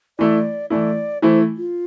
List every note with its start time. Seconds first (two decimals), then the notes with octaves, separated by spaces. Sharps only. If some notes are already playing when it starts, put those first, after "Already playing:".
0.18 E3 A3 E4 D5
0.70 E3 A3 E4 D5
1.22 E3 A3 E4 C5
1.57 F4